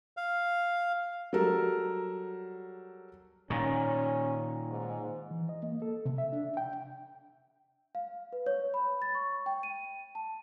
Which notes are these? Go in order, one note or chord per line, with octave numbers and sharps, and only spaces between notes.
F5
F#3 G3 A4 A#4
A#2 D#3 C#4
G#2
E3
D#5
A#3
A4
C3
E5
D4
G5
F5
B4
C#5
B5
A6
C#6
G5
D#7
A5